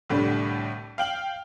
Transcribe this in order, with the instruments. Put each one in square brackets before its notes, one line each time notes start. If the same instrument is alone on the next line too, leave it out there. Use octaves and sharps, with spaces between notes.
[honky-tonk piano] C2 A2 D3 G3
F5 G5 F#7